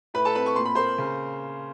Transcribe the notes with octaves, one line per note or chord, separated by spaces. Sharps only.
A2 B4 B5
A4 A5
C4 B4 B5
C#6
A#2 C6
B5
A#3 C5 C6
C#3